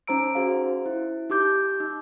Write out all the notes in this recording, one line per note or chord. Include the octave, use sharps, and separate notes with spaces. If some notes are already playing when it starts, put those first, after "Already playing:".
C#4 D#4 C5 A#5 E6 D7
F#4 G#4 C5 F5
E4
D#4 G4 D6 G6
D#4